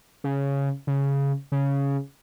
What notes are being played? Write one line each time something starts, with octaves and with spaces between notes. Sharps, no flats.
C#3
C#3
C#3